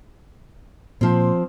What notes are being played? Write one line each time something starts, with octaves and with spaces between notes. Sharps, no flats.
A#2 F3 C4